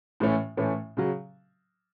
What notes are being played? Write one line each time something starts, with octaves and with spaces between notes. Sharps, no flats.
A2 E3 A3 C#4
A2 E3 A3 C#4
C#3 F#3